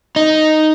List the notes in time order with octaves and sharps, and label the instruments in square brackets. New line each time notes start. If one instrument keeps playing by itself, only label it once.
[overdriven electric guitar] D#4